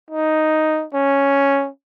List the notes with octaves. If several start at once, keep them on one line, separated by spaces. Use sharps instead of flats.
D#4
C#4